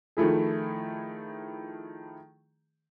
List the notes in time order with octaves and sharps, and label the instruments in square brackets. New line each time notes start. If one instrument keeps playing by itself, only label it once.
[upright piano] D#3 F3 A3 E4 G#4